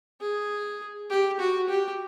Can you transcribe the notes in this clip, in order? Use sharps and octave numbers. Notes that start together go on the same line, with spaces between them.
G#4
G4
F#4
G4